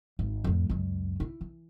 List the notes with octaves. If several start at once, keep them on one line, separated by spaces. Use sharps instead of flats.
G#1
F2 A2
C#2 F#2
E4
E3